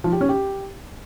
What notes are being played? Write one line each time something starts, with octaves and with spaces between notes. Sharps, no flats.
F3
G4
C#4
G4